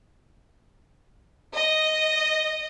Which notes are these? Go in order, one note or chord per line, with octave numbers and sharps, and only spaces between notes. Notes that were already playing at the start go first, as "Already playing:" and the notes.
D#5